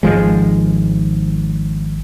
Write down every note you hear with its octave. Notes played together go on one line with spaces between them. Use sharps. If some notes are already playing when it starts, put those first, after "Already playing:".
G#1 F3 G#3